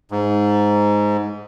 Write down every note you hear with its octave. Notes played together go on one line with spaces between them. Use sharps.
G#2